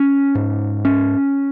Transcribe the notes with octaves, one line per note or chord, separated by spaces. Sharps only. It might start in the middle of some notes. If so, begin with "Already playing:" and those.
Already playing: C#4
G#2
C#4